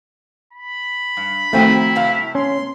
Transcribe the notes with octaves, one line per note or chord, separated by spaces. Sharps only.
B5
G2
D#3 F3 A3 C4 E4 F#4 G5
A2 C3 F5
C#4 C6